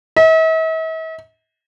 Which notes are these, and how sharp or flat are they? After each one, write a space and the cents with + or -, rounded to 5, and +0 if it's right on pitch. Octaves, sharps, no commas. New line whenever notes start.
E5 -45